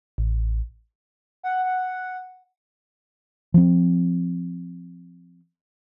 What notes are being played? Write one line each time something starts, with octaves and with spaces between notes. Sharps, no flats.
A1
F#5
F#5
F3 C4